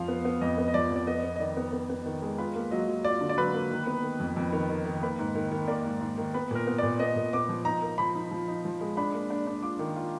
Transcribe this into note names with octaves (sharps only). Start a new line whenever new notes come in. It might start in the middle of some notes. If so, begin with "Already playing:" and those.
Already playing: F2 F3 F5
B3
B3
F2 D#5
B3
D#5
F3 D5
F2
D5
B3 D#5
B3
D#5
D#3 D5
B3
B3
B3
D#3
G#3
F4 B4
A#3
F#3 D#5
F#3
F4 D5
D3
D5
F#3 B4
A#3
D#3
B3
D#3
F2
F2
D#3
D#3
D#3
A#3 B4
G#2
D#3
D#3
A#3 D5
G#2
G#2
D#3
B3 B4
A#2 A#4
B3
A#2 D5
B3 D#5
A#2
B3 D6
F3
D#4 A#5
A#4
F3 B5
D#4
F3
D#4
F3
G#3
D4 B5
A#3
D4
D4
F4 D6
D#3
F4